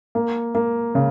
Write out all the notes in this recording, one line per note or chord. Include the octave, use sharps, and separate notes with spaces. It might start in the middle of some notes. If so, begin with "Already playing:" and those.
A#3
A#3
C#3